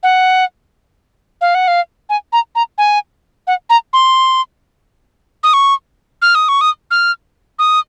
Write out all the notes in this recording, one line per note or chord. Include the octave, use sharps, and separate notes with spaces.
F#5
F5
F#5
F5
G#5
A#5
A#5
G#5
F#5
A#5
C6
D#6
C#6
F6
D#6
C#6
D#6
F6
D#6